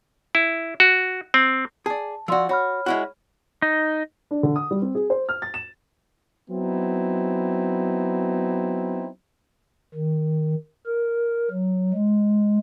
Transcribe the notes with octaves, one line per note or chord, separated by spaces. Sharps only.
E4
F#4
C4
G#4 D5 A5
F3 F#4 D5 C6 E6
F#4 C#5 B5 F6
G#3 E4 F#4
D#4
D4
D3
D#6
G3
C4
G#4
C5
F6
A6
E7
F#3 B3 C4 D#4 E4
D#3
A#4
F#3
G#3